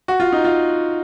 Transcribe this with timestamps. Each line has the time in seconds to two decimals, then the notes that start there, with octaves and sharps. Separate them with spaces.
0.08 F#4
0.20 F4
0.32 D#4
0.45 F4